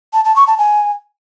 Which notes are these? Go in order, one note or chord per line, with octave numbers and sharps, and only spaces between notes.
A5
A5
C#6
A5
G#5